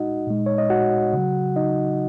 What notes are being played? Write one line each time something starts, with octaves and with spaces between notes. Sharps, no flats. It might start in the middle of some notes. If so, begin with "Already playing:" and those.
Already playing: A#2 G#3 D#4 F#4 D#5 F#5
A#2 G#3
C#5
D#5
F#4 F#5
C#3 F#3
D#4 D#5